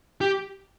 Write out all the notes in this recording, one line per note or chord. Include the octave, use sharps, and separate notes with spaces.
G4